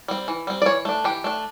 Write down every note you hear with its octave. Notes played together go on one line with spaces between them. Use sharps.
G3 C4
E3
G3 C4
D5
E3 C#5
A3 D4
E3 G4
A3 D4